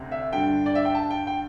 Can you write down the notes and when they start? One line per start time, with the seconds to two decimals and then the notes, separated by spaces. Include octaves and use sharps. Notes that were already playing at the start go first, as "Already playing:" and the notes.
Already playing: D2 C3
0.11 E5
0.33 G2 D3 G5
0.66 D5
0.75 E5
0.85 G5
0.95 A5
1.11 G5
1.27 G5